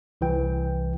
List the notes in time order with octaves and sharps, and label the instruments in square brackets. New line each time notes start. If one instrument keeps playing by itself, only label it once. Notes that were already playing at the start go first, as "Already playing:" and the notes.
[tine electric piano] C2 E3 G5